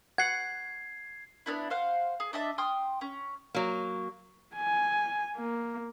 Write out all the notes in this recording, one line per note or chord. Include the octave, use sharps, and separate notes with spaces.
F#5 G#6 C7
B3 C4 D4 E4
C5 F5 F#5
G#4
D4 D#5 E5 A5
G5 C6 D#6 F6
C#4
F#3 A#3
G#5
A#3